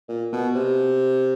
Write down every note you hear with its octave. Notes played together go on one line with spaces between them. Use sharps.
A#2
B2
C3